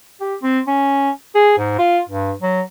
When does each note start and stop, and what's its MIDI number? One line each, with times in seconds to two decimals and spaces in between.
0.21 0.35 67
0.43 0.60 60
0.67 1.10 61
1.35 1.53 68
1.58 1.78 44
1.79 2.01 65
2.09 2.33 43
2.42 2.62 54